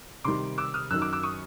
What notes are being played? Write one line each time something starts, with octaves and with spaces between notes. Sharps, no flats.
C3 D#3 G3 C6 D6
D6 E6
D#6 F6
F#2 D#3 F#3 E6 F#6
D6 E6
D6 E6
C#6 D#6